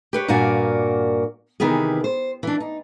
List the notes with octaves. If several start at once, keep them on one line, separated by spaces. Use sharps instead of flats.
G4 B4 C#5
G2 A#2 A#3 F#4 D5 G#5
C3 D#3 E3 B3 G4 G#4
C5
E3 D4
D#4